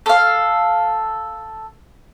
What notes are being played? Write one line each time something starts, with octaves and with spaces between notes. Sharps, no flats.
A4 F5